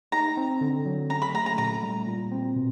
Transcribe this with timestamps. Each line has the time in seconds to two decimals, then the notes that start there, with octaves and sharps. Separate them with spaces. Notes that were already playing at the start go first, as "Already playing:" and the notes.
0.12 D#4 A#5
0.37 C4
0.61 D3
0.86 F#3
1.10 C#4 A#5
1.22 B5
1.34 A3 A#5
1.46 A#5
1.58 A#2 A#5
1.83 G3
2.07 A#2
2.32 C4
2.56 B2